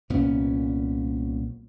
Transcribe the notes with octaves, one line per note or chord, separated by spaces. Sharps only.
C2 A#2 B3 C#4